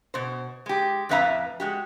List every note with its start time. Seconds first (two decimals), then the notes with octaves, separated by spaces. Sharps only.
0.14 B2 C5
0.66 G#3 G4
1.09 F2 A2 B4 E5 F5 A#5
1.60 G#3 F#4 G4